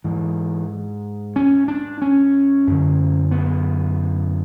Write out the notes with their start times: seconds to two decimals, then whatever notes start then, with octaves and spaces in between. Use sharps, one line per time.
0.04 G#2 E3
1.36 C#4
1.68 D4
2.02 C#4
2.67 F#2 D3
3.31 B3